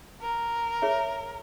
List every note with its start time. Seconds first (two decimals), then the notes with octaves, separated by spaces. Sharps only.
0.22 A#4
0.82 G#4 C#5 E5